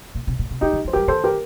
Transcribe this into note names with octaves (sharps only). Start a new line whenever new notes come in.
A#2
C3
A#2
C3
D3 D#4 G4
D#3
F3
C5
G3 G4 A#4
D#3 A4 C5
G4 A#4